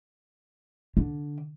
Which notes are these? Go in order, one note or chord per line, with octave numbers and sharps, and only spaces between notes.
D3